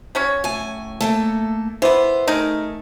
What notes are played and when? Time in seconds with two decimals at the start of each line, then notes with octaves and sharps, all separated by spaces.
0.15 F#3 C#4 C#5
0.44 A2 G#5
1.01 A3 A#3 A4
1.82 E3 B3 C5
2.28 A3 D#4 G#4 A#4